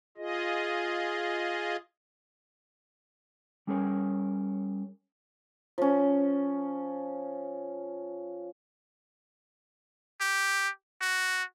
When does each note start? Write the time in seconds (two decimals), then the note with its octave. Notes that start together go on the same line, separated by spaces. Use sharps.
0.17 F4 G#4 D#5
3.67 G3 C#4 G#4 A#4 C#5
5.78 F3 C#4
10.21 G4
11.01 F#4